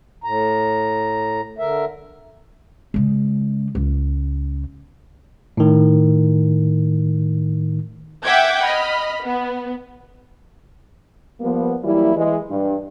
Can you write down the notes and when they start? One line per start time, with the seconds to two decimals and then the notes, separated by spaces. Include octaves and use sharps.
0.24 A2 A#5
1.58 D3 A#4 E5
2.94 C#3 G#3
3.75 C#2
5.57 A2 D#3
8.23 E5 F#5 G5 D6 G6 G#6
8.64 D#5 B5 F6
9.23 B3
11.41 F3 G3 A#3 B3
11.83 E3 F#3 G3 A#3 E4
12.16 E3 G#3
12.50 G2